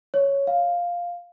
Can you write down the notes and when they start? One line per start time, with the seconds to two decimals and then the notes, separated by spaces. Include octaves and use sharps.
0.14 C#5
0.47 F5